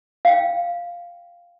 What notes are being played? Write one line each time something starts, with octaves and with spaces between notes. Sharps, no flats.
F5 G5